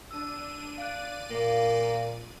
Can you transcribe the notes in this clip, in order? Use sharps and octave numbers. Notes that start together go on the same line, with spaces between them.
D4 E6 D#7
D5 F5 F#6 D#7
A#2 A#3 F5